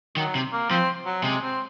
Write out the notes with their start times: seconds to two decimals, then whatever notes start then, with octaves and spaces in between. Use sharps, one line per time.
0.17 D#3 F#3
0.35 C3
0.53 A#3
0.70 F3 C4
1.06 F#3
1.23 C3 G#3
1.42 C4